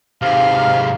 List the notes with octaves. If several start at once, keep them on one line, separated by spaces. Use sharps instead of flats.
G#2 C3 F5